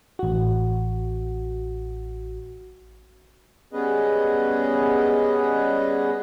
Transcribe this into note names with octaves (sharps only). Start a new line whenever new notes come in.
A1 F#4
G3 B3 C#4 G#4 B4 D#5